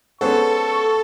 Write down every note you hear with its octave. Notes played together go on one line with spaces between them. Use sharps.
G#3 B3 C#4 A4 C5 F#5 C#6